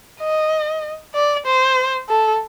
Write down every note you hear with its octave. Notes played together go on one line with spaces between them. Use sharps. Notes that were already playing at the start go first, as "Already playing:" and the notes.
D#5
D5
C5
A4